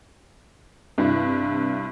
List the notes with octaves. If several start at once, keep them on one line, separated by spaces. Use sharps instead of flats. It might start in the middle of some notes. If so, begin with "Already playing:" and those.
G2 C3 E4